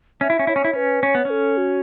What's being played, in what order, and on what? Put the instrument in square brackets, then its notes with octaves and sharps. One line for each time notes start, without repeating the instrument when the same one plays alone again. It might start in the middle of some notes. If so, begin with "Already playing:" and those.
[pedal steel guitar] C#4 [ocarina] E5
[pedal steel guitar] E4
C#4
[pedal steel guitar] E4 [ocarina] C#5
[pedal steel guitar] C#4
E4
[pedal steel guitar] C#4 [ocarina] B4
[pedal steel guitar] C#4 [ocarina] C#5
[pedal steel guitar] B3
C#4
[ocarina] A4
F#4